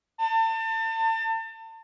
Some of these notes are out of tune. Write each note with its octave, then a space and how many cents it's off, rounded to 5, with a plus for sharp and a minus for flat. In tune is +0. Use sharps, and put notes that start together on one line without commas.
A5 +35